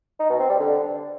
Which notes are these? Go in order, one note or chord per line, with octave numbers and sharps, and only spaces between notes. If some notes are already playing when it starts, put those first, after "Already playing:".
D#4
B2
C4
G3
D3